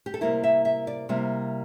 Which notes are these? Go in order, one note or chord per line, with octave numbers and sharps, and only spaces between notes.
G4
A4
C3 G3 A#3 E4 A#4
E5
E5
D5
C3 G3 A#3 E4